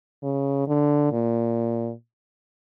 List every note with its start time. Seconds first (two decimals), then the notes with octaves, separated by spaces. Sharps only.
0.23 C#3
0.68 D3
1.12 A#2